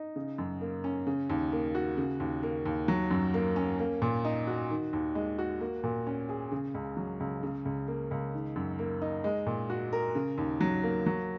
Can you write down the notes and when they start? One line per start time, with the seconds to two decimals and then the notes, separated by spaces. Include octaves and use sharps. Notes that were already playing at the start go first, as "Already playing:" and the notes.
Already playing: D#4
0.16 C#3
0.38 F#2
0.61 A#3
0.84 C#4
1.07 C#3
1.30 D#2
1.52 A#3
1.75 F#4
1.97 C#3
2.20 D#2
2.43 A#3
2.65 D#2
2.88 F#3
3.11 F#2
3.34 A#3
3.56 C#4
3.79 A#3
4.02 A#2
4.25 D#4
4.47 F#4
4.70 D#3
4.93 D#2
5.15 G#3
5.39 F#4
5.61 A#3
5.84 A#2
6.07 C#4
6.29 G#4
6.52 C#3
6.74 C#2
6.97 F#3
7.20 C#2
7.43 C#3
7.65 C#2
7.88 A#3
8.11 C#2
8.34 D#3
8.56 F#2
8.79 A#3
9.02 D#4
9.24 G#3
9.46 A#2
9.70 F#4
9.93 A#4
10.15 C#3
10.38 D#2
10.61 F#3
10.83 A#3
11.06 F#3